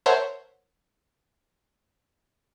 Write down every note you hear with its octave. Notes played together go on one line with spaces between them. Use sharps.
A#4 C5 C#5 E5 F#5 A5